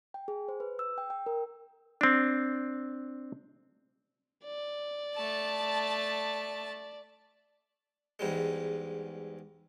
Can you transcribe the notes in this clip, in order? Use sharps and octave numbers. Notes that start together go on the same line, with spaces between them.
G5
G#4
C5
B4
E6
G5
G5
A#4
C4 D4
D5
A3 A5
E2 G#2 G3 G#3